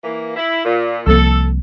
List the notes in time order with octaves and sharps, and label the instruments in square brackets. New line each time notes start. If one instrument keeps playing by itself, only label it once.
[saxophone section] E3 A#3
E4
A#2
[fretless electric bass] C2 F3 A#3 [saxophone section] A4